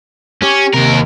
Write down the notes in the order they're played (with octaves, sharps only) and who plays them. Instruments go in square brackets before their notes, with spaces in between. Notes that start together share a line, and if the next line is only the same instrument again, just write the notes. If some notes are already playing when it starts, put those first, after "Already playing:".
[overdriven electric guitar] C#4 [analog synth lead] G4
[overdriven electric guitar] D#2 A#4 [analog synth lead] C3